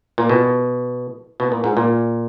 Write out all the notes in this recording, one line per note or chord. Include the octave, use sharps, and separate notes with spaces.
A#2
B2
B2
A#2
G#2
A#2